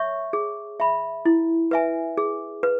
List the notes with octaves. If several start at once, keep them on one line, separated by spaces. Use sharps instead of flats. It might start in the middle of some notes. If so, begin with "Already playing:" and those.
Already playing: C#5 E5 C#6
G#4
E5 B5
E4
B4 E5 G#5
G#4
B4